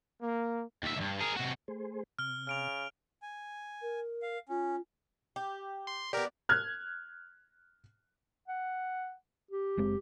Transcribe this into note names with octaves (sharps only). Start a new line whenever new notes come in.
A#3
D#2 E5
C#2 G2
G#4 A#4
C3 F#4
A3 G#4 C5
C3 F6 G7
C#3 F6 D7 F7
G#5
A#4
F5
C#4 F4
G4
C6
B3 G4 A#4 D5
F6 F#6 G#6
F#5
G4
F#1 G#3 C4